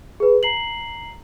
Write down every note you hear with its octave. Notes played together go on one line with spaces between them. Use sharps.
G#4 B4
A#5 C7 F#7